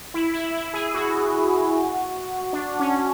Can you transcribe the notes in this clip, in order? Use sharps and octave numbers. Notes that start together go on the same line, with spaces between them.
E4
E4
E4
G#4
F#4
D4
C#4